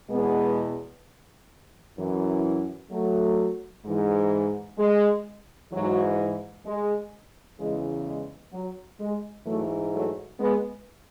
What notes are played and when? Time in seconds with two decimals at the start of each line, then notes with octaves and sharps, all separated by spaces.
0.10 E2 B2 G#3 B3
1.98 F#2 E3
2.91 F#3 A3
3.85 G#2 E3
4.78 G#3
5.72 G#2 E3 F#3
6.66 G#3
7.60 E2 C#3 E3 G#3
8.06 G#3
8.53 F#3
9.00 G#3
9.47 G#2 E3 F#3 A3
9.94 F#3 A3
10.40 G#3 B3